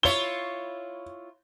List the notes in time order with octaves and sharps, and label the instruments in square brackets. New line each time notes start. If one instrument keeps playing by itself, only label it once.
[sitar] E4 F4 C#5 [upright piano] G7